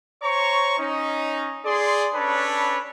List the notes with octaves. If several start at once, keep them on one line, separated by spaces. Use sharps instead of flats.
C5 C#5 A#5 C#6
C#4 D#4
G#4 D5 C6
C#4 D4 A4 B4 C#5 B5